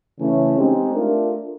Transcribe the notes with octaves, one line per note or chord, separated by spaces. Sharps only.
C#3 E3 A3 C#4
G#3 C4 D#4 G4
A3 D4 F4 A#4